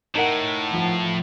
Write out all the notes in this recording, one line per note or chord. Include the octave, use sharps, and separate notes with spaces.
A2 D#4 A#4 F#5
F3